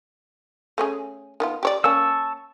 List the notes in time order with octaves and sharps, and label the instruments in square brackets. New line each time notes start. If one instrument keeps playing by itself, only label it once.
[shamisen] A3 C#4 G#4
D#3 B3 F4
G4 C#5 D5
[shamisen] A#3 C#4 [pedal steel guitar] A5 C#6 E6